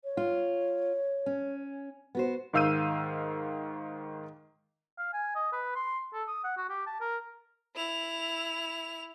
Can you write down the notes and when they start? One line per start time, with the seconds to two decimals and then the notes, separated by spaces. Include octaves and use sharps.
0.04 C#5
0.17 F4
1.26 C#4
2.15 B3 F#4 C5
2.53 G#2 D#3 F5 E6 G6 D#7
4.98 F5
5.13 G#5
5.35 D#5
5.52 B4
5.75 C6
6.13 A4
6.28 D#6
6.44 F#5
6.57 F#4
6.70 G4
6.86 A5
7.00 A#4
7.76 E4 F7